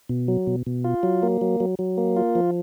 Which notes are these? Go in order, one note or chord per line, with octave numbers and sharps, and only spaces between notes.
B2
F#3
B2
B2
F4
F#3
A#3
F#3
F#3
F#3
A#3
F4
F3